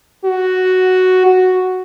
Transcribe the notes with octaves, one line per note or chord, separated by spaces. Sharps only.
F#4
F#4